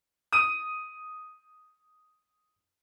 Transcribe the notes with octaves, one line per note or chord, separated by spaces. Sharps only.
D#6 D#7